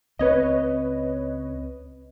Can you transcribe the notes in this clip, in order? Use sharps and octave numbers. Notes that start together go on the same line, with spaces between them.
C#2 C4 B4 C#5 D#5